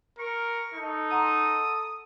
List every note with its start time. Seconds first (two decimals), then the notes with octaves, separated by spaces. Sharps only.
0.19 A#4 C#6
0.74 D#4 A4
1.11 F#5 A#5 C6 D#6